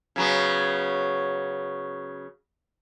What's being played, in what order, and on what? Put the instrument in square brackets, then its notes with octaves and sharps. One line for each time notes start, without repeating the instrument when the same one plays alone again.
[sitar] C#3 F#3 B3